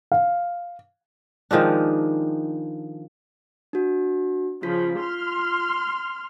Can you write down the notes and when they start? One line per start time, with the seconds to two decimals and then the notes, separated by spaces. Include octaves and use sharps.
0.12 F5
1.51 D#3 F3 G#3 D4
3.73 D4 F#4
4.63 C#3 F3 F4 B6
4.98 C6 F6